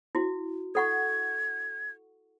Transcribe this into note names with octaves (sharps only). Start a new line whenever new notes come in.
E4 F#4
A4 F#5 C#6 G#6